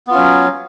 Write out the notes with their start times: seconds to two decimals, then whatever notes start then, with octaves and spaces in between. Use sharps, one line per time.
0.07 B3
0.11 F4
0.14 C#4
0.18 F#3